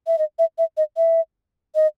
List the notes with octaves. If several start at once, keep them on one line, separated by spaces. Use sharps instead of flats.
E5
D#5
E5
E5
D#5
E5
D#5